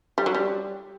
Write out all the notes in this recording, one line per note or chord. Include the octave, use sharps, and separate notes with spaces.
G3
F#3
G3